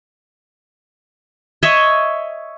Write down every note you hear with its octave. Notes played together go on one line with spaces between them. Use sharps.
C#5 D#5 E5